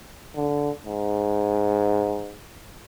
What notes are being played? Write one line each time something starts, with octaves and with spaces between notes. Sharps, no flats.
D3
G#2